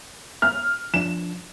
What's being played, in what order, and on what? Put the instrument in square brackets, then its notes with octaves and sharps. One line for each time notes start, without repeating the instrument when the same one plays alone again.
[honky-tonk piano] F6
[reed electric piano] F3 D4 [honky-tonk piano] E7